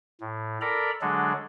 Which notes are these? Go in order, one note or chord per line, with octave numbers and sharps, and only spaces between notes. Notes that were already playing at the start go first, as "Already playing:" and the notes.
A2
A4 A#4 D5 A#5 B5
D3 F#3 G#3 D4 G#4 A4